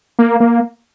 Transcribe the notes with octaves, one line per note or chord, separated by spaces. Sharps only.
A#3
A#3